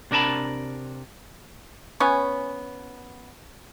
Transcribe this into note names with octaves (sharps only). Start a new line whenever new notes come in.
C3 D4 A#4 A5 B5
B3 C#4 C#5 G#5